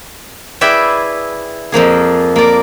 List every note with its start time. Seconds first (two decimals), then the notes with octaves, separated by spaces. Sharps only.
0.61 E4 G#4 B4 D5 E5 G5
1.72 F2 F3 A#3 G#4
2.36 A#3 D5